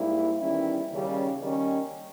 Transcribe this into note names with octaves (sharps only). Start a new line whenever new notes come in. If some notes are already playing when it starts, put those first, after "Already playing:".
Already playing: G#2 G3 A#3 E4
E2 D#3 G3 C#4 E4
D#2 C#3 G3
D#2 D#3 G3 C#4